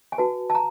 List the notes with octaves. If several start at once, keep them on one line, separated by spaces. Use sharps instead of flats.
G#5
F#4 B4 A5
A5
A#5